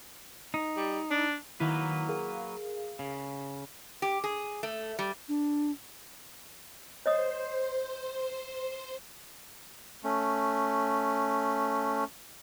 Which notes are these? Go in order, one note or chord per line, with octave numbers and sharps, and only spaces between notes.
D#4
G3
D4
D#3 F#3 A#3 E4 B4
G#4 A#4 F5
C#3
G4
G#4
A3
G3
D4
C5 C#5 D#5 D#6
A3 C#4